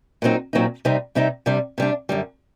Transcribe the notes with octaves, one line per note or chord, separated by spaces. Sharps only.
A#2 F#3 C4 D#4
A#2 F#3 C4 D#4
C3 G3 C4 D#4
C3 G3 C4 D#4
C3 G3 D4
C3 G3 D4
F#2 D3 G3